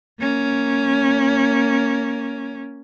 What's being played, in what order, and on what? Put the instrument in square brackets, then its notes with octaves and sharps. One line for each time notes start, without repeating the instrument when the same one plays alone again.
[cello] A#3 C#4